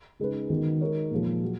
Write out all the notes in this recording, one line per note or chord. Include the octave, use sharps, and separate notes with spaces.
C#3 G#3 D#4 G#4 B4
D#3 G#3 B3 D#4 F#4
G#3 D#4 A#4 C#5
A#2 F3 G#3
F#3